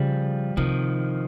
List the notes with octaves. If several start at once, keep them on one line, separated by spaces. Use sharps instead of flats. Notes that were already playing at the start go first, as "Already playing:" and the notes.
Already playing: C#3 F3 G3
C3 D#3 F3